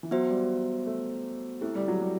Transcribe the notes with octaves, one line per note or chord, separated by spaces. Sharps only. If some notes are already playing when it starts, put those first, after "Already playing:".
E3
F#3 B3 F#4 C5 E5
G3
A3
A3 C4 E4 G4
G3
F#3
G3